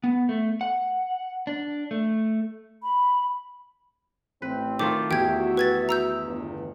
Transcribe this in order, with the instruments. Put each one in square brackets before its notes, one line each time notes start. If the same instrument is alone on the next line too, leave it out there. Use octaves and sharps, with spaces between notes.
[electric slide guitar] B3
A3
F#5
D4
A3
[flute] B5
[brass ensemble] A1 C4 [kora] B4
[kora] D#3 A3 F4 [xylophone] D6
[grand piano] E2 [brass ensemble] F#4 E5 [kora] G4 [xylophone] G5 G#6
[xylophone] B4 G#6 A6
A#5 E6 G6
[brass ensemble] G1